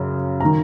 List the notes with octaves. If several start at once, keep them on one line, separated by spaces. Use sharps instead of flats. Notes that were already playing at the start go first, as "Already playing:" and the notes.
Already playing: F#2 C#3
D#3 A#5